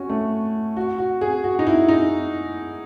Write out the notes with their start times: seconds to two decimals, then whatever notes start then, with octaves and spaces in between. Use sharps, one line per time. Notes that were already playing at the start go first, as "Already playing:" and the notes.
Already playing: C#4 F#4
0.09 A3
0.77 F#4
0.99 F#4
1.21 G#4
1.44 F#4
1.59 D#4
1.67 E4
1.88 D#4